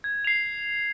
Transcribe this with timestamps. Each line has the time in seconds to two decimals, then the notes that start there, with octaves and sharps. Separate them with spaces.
0.04 G#6
0.25 C7 F7